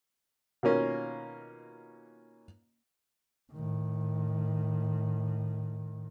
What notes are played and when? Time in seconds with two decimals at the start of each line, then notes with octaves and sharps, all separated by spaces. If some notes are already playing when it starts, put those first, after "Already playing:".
0.63 B2 D#3 A#3 C#4 F4
3.52 A2 D#3